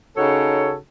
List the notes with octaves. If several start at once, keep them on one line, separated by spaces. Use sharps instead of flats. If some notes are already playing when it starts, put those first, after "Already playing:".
C#3 D#4 F#4 A4 C#5